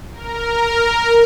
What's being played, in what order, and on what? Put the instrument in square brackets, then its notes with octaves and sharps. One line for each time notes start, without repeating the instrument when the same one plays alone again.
[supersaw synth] A#4